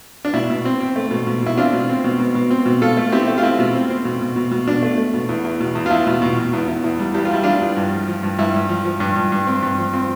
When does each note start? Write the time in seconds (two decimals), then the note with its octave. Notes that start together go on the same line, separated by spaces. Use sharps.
0.25 D4
0.34 B2 E4
0.50 B2
0.65 C4
0.80 C4
0.96 A3
1.11 B2
1.27 B2
1.42 B2 E4
1.57 C4 D4 F4
1.73 B2
1.89 C4
2.04 B2
2.20 B2
2.35 B2
2.50 C4
2.66 B2
2.81 B2 F4 A4
2.97 A3
3.12 C4 E4 G4
3.28 A3
3.38 F4
3.43 C4 E4
3.59 B2
3.75 C4
3.90 C4
4.05 B2
4.21 B2
4.36 B2
4.51 B2
4.67 B2 D4
4.83 A3
4.98 A3
5.14 B2
5.29 E2
5.45 E2
5.60 B2
5.75 E2
5.86 F4
5.91 E2 E4
6.07 B2
6.22 B2
6.38 B2
6.53 E2
6.68 E2
6.84 E2
6.99 G3
7.14 E2 G4
7.25 F4
7.31 G3 E4
7.43 G3 D4 F4
7.61 E2
7.77 G2
7.92 F3
8.08 F3
8.23 G2
8.38 G2 E4
8.54 G2
8.69 F3
8.85 F3
9.00 G2
9.16 G2
9.32 G2
9.47 C4
9.62 G2
9.78 F3
9.93 C4